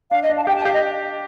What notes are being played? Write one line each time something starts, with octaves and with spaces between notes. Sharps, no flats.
D4 F5
D#5
D4
A5
F5
G4 G5
A5
G4 F5
D#5